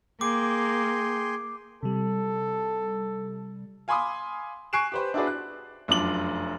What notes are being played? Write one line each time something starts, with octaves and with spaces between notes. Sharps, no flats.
A#3 G#4 G5 C6 D6
C3 G3 A4
F5 G#5 B5 C6 D6 D#6
G#5 C#6 F#6 C7 D7 E7
G4 B4 C5
D4 E4 F#4 G#4 B4 D5
F#6
F1 F#2 D4 F4 D6 F#7